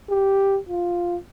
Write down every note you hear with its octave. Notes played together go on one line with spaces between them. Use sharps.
G4
F4